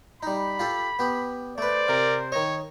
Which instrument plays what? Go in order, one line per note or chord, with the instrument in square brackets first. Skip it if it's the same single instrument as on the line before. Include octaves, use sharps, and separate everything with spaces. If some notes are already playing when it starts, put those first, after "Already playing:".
[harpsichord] G3 D#4 [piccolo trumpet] B5
[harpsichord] F4 G4 A4
B3 G4
[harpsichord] A3 B4 [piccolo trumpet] C5 [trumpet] D5
[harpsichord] C3 [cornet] A#4
[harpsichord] D#3 D#5 [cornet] C#5